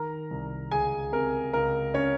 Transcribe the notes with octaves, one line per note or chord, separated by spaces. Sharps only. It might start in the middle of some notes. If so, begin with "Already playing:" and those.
Already playing: D#3 A#4 A#5
C2
C#2 G#4 G#5
C3 A#4
C#2 A#4
C#4 C#5